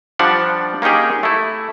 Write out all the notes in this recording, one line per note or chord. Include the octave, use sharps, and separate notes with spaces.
F3 G3 D4 F#5
A#3 C#4 D#4 G4 G#4
A3 E4